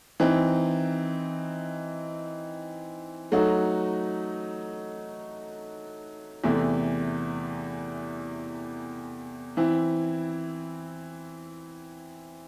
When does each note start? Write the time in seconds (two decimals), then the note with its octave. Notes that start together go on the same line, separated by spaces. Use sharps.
0.20 E3 C4 D#4
3.32 F#3 A3 D#4 F#4
6.44 E2 C3 E3 A3
9.57 E3 C4 E4